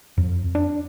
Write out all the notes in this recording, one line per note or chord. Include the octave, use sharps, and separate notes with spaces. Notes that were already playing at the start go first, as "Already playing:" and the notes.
F2
D4